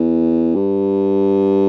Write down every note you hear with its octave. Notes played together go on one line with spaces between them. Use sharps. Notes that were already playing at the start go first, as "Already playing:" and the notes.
Already playing: E2
G2